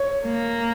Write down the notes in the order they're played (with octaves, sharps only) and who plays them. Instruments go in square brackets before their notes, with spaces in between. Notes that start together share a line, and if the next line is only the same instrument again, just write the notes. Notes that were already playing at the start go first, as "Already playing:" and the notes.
Already playing: [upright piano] C#5
[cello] A#3